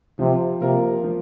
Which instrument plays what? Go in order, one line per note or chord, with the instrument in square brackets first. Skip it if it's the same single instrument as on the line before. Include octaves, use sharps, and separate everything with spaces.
[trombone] C3 [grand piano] F3
[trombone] C3 [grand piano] A#3 F4 A#4
[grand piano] F3